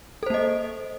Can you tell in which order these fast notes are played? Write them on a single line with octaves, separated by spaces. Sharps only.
A4 C5 A#3 D#5